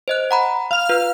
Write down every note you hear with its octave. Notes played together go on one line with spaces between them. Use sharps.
C5 D#5 F#6
F#5 A#5 B5
F5 F6
F4 B4